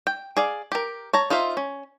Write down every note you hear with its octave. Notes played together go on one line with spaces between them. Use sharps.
G5
G#4 D5 F5
G4 A#4
C#5 A5 A#5
D#4 F4 C5 E5 F5
C#4